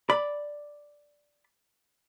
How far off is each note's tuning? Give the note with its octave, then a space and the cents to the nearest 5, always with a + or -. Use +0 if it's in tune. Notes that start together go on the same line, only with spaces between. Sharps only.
D5 +0 B5 +0